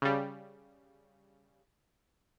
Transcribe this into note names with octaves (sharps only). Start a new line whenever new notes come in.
C#3 G3